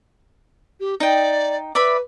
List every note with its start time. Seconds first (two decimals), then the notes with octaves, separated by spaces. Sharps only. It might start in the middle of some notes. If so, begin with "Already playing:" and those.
0.80 G4
1.00 D#4 D5 G5
1.75 B4 D5 E5 B5